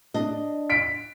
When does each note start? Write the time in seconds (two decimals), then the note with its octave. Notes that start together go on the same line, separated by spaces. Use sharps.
0.14 D4 D#5
0.70 B6 D7